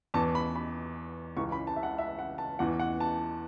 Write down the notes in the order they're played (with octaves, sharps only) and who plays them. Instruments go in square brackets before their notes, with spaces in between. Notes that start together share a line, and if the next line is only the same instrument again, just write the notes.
[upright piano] E2 E3 A5
B5
B5
C#2 C#3 E3 C#6
B5
A5
E5
F#5
E5
F#5
A5
E2 E3 F#5
F#5
A5